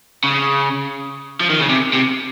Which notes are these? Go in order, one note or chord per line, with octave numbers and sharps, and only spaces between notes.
C#3
F3
D#3
C#3
C3
C3